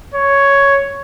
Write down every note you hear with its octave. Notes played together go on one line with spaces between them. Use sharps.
C#5